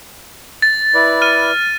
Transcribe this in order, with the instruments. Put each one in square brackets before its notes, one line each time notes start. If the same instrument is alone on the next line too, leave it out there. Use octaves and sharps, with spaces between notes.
[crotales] A6
[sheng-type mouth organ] E4 B4 D5
[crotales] F6 D#7